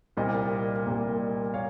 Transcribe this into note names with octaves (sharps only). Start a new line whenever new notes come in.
C2 A#2 G3 A#3 C5 D#5
C2 A#2 G3 A#3
A#3 C#5 F5